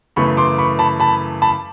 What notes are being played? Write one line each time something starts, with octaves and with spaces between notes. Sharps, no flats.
F#2 C#3 E3 A3 B5 C#6
C6 D6
B5 C#6
A5 B5
A5 B5
A5 B5